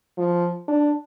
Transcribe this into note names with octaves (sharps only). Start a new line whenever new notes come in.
F3
D4